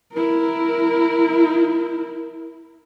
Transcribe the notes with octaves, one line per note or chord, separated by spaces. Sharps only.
E4 A#4